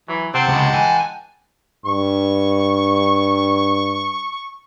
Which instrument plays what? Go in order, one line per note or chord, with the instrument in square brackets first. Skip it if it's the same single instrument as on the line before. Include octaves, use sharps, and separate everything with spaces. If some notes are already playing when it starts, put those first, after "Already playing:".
[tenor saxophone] E3 [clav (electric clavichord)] F#3
[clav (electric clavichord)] C3 [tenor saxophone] C4 [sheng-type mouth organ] F#5 G5 A5
[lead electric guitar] C#2 [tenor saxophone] G#3
[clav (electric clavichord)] E3 [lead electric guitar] G#5
[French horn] G2 [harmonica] C#6